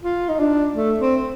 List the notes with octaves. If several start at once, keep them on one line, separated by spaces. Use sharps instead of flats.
F4
D#4
D4
A3
C4